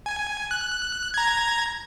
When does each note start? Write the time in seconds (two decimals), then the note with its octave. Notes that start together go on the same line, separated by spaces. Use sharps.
0.06 G#5
0.51 F#6
1.14 A#5 G#6